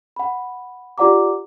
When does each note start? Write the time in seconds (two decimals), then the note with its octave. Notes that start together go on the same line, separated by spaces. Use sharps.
0.16 F#5 B5
0.98 F4 G4 D5 F#5 A#5 D6